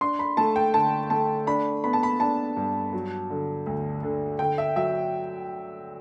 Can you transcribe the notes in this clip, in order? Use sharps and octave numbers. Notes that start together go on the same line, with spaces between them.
D4 C6
B5
A3 A5
G5
D3 A5
A3 A5
D4 B5
B3 B5
A5
B5
D4 A5
G2
F#3
D3
D2
D3
D3 G5
E5
F#3 E5